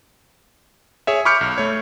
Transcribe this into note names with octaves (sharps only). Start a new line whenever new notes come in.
G#4 C#5 E5
B5 C#6 D6 F6 G6 C#7
B1
A3 C#5